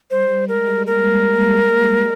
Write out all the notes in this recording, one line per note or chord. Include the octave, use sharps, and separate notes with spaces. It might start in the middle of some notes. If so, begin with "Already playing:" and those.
G3 C5
G#3 A#4
A#3 A#4